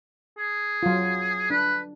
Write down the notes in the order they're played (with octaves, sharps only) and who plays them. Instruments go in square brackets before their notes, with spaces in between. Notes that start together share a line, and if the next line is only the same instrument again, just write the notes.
[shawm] G#4
[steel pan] F#3 F4
[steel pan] D4 [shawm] B4